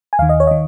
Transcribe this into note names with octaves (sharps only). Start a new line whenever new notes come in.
G#5
D#2 D#3 F5
D#5
C#5
D#5
D#3